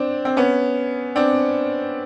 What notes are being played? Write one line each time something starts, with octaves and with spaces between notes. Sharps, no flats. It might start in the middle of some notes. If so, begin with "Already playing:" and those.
Already playing: C4 D4
C4
B3 C#4
C4 D4